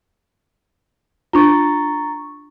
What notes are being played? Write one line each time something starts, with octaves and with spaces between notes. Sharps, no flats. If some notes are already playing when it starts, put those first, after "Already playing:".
D4 F4 A#5 C#6 A6